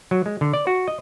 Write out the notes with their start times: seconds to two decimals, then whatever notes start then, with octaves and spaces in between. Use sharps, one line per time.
0.11 F#3
0.26 G#3
0.41 D3
0.53 D5
0.67 F#4
0.88 D#5